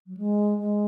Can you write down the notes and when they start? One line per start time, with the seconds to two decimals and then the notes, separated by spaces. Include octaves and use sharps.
0.07 F#3
0.17 G#3
0.59 G#3